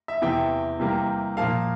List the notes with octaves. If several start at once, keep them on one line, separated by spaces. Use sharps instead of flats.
E5
E2 C3 E3 E5 G5
C3 E3 G3 A#3
A#2 F3 A#3 F5 A5